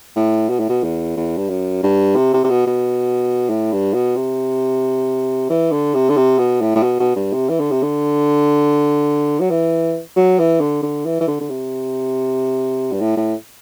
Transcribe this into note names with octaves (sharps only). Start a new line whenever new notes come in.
A2
B2
A2
B2
E2
E2
G2
F#2
G2
C3
C3
C3
B2
B2
A2
G2
B2
C3
E3
D3
C3
D3
C3
B2
A2
A2
B2
B2
G2
C3
E3
D3
C3
D3
F#3
E3
F#3
E3
D3
D3
E3
E3
D3
D3
C3
G2
A2
A2